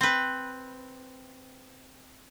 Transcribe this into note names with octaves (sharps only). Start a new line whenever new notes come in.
C4 B4